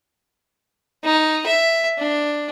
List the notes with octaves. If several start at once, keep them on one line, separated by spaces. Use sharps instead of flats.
D#4
E5
D4